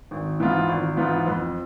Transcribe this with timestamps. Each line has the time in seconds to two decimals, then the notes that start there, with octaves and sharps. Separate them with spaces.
0.11 G#1
0.40 G#2 E3 B3 F4
0.69 G#1
0.97 G#2 E3 B3 F4
1.27 F2